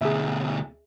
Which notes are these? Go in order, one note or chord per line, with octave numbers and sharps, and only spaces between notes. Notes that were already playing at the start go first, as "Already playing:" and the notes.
D2 B2 G#4 E5